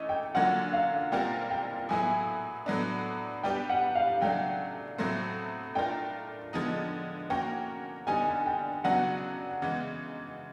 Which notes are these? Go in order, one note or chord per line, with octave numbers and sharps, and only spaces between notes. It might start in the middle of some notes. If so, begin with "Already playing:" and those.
Already playing: E3 A3 C#4 E4 D#5
G5
D3 F#3 A#3 C#4 F4 F#5
F5
A#2 G3 C4 F4 A#4 G5
G5
A2 F#3 B3 E4 G#4 G#5
A2 F#3 B3 D4
G3 B3 D4 G4 B4 G5
F#5
F5
C#3 F#3 A3 D4 G5
A2 F#3 A3 C4
A3 D4 F4 A#4 G5
D3 F3 G#3 B3 D#4
A#3 C#4 F#4 A#4 G5
D3 G3 B3 D#4 G#5
G#5
G5
C#3 F#3 B3 D4 F#4 F#5
C#3 E3 G#3 B3